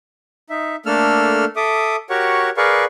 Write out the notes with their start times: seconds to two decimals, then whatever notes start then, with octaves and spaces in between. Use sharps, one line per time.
0.50 D#4 E5
0.86 A3 A#3 D4 A4 E6 F6
1.56 A4 E5 D6 D#6
2.10 F#4 G4 A#4 C#5 F#5 C#6
2.57 G#4 A#4 B4 D5 F5 C#6